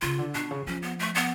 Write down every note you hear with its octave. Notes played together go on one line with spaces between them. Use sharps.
C#3 F4
D3
B2 D4
C#3
F3 C#4
B3
A3
B3